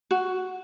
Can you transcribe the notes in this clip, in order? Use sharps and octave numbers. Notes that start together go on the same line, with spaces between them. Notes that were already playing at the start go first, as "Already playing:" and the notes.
F#4